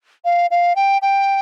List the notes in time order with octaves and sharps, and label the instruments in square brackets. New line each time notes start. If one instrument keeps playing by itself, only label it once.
[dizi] F5
F5
G5
G5